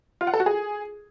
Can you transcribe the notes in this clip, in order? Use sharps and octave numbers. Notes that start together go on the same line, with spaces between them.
F4
F#5
A4
F#4
G#4